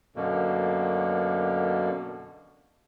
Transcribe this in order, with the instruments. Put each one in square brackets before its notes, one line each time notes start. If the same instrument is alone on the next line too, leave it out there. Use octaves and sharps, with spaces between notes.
[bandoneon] F#2 B2 D3 A#3